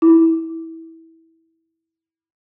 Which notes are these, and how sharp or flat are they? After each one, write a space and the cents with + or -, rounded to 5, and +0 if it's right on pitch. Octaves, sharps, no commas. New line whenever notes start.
E4 -20